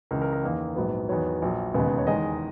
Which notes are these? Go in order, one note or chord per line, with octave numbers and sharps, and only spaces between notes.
C#2 C#3 E3 A#4
A#4
A#4
E2 D#3 A#3
A#1 G#2 F#3 B3
E2 D#3 F#3 B3 C#5
A#1 A#2 F#3 A#3
E1 D#2 C#3 G#3 B3
C#5
E2 D#3 G#3 D#5